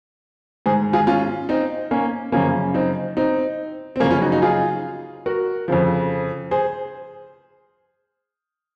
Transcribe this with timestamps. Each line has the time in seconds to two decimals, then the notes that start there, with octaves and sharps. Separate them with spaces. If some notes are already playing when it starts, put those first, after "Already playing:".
0.66 G#2 G#4 C5
0.69 D#3
0.93 F4 G#4
1.07 C#4 F4
1.49 C4 D#4
1.91 A#3 C#4
2.32 F#2 C#3 F3 A#3 C#4
2.74 C4 D#4
3.17 C4 D#4
3.96 C4
4.00 F#2 C#3 F3 A#3 C#4
4.11 C#4 F4
4.22 D#4 F#4
4.32 D#4 F#4
4.42 F4 G#4
5.26 F#4 A#4
5.68 F2 C#3 F3
6.51 G#4 C5